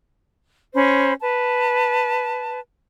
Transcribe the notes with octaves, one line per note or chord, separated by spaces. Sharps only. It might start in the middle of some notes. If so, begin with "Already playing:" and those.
C#4 C5 B5
B4 A5